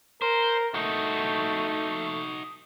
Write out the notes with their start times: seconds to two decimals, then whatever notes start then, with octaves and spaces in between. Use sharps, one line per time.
0.22 A#4 C5
0.74 A3 D#4 F#4